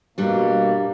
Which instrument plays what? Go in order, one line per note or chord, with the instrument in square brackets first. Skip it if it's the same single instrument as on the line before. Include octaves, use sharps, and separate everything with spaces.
[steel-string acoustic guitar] G2 G3 D4 [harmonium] B2 A#3